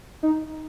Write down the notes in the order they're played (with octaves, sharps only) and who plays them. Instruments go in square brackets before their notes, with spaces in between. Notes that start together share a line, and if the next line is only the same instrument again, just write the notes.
[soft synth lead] D#4